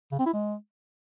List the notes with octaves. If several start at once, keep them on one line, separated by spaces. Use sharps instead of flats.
C#3
C4
E4
G#3